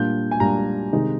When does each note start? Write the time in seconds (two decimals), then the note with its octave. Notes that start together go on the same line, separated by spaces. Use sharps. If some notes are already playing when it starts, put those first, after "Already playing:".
Already playing: A#2 G3 D4 G6
0.31 G#5
0.40 A#2 G3 D4 A#5
0.93 C3 D#3 G#3 D#4